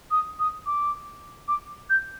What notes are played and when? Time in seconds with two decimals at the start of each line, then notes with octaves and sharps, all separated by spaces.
0.11 D#6
0.39 D#6
0.66 D6
1.48 D6
1.90 G6